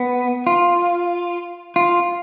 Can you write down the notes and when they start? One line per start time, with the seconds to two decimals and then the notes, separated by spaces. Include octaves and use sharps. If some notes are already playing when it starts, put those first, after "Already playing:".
Already playing: B3
0.47 F4
1.76 F4